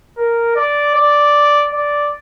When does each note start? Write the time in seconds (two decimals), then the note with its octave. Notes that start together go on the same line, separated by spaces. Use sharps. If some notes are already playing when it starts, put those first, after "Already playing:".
0.17 A#4
0.56 D5
0.95 D5
1.73 D5